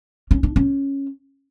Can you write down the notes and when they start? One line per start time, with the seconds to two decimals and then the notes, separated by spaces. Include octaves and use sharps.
0.31 C#4
0.43 D4
0.56 C#4